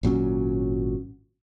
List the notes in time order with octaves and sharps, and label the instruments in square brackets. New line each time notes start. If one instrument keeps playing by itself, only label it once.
[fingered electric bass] G#1 A#2 F#3 C#4